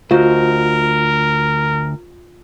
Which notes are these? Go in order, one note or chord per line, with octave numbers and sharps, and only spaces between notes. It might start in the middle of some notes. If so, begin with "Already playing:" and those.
D2 F4 F#4 A#4 C5 D#5